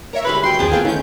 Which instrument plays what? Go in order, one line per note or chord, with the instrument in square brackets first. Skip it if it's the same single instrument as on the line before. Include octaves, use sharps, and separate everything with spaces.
[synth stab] A#4 C#5 E5 [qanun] A#5
[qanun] G3 G#3 C5 [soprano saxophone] B4 [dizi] B5
[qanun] F#3 G#4 [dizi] G5 [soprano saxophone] C6
[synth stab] G#1 D#2 [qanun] C4 A5 [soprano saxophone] G#4
[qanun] A3 B3 [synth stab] F4 A4 F5
[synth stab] D#3 G6 [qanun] E3 [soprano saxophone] C#4